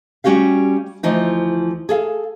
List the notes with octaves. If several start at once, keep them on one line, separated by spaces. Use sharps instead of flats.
G3 C#4 F#4 G4 F5
D2 E3 F3 D#4
G#4 A4 F5